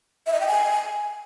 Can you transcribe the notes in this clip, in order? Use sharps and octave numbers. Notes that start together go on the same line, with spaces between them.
E5
D#5
G5
G#5